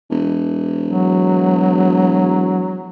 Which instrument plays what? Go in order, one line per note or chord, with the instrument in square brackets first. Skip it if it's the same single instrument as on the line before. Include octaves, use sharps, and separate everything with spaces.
[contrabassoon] E1
[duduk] F#3